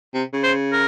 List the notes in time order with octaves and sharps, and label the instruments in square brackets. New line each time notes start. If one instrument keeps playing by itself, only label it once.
[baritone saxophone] C3
C#3
[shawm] C5
A#4